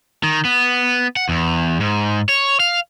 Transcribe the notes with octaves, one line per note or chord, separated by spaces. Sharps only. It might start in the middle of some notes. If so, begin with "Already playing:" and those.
D#3
B3
F#5
E2
G#2
C#5
F5